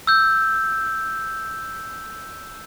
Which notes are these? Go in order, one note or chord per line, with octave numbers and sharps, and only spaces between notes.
E6 G6